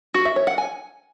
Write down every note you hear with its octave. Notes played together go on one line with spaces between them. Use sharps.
F#4
E5
C#5
F#5
G#5